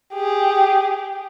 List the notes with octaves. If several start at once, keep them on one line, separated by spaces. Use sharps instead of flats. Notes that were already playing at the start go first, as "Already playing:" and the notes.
G4 G#4